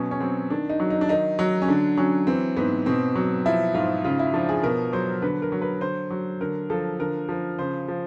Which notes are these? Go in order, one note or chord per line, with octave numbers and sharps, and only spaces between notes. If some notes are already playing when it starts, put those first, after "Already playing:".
Already playing: B2 F#3 C#4
C#4
F#3 C4
D#3 D4
D#4
F#3
D#4
D4
D#3 D#4
F#3
C#4
D3 D4
F#3 C#4
E3 C4
G#2 B3
B2 C4
F#3
F3 E4
G#2 F4
C#3 F4
E4
F3 D4
G#4
B2 A#4
F#3 C5
D3 B4
A#4
F#3
B4
D3 C5
F#3
D3 A#4
F3 A4
D3 A#4
F3
C#3 C5
F3